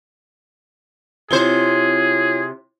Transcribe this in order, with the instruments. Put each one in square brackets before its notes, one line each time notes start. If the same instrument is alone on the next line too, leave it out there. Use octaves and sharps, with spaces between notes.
[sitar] C3 C5 [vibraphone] E4 F4 C#5 [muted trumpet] G#4